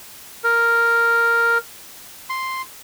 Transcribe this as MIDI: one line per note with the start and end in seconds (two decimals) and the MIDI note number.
0.44 1.58 70
2.30 2.62 84